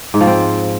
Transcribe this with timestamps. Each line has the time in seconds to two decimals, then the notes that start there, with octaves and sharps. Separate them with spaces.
0.14 G#2
0.20 F3
0.27 C4